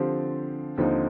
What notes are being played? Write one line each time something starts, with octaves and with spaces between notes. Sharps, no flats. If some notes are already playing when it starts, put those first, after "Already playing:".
Already playing: D3 F3 C4 G4
D#2 D3 F3 C4 D#4